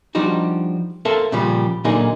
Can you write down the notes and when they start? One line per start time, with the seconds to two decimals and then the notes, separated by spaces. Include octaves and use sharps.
0.15 F3 G3 D4 D#4 F#4
1.05 A4 A#4 C5 E5 F5 A5
1.32 A#2 C#3 F3 G3
1.84 A#2 D3 F#3 A#3 D#4 G#4